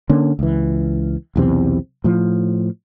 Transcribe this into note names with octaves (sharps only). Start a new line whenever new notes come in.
D3 A#3 C#4
C#2 E3
B1 E2 C3 C4
A2 F3